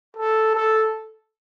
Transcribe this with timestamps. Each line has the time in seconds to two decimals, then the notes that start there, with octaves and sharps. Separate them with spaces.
0.17 A4
0.55 A4